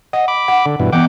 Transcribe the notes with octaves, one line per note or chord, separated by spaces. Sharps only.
D#5 F#5
B5 D6
F#5
D3
G2 B2 E3
E3 B3 F#5 G5 D6